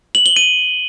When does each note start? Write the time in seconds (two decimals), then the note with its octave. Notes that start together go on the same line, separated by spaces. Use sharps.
0.15 F#7
0.26 G7
0.36 D#7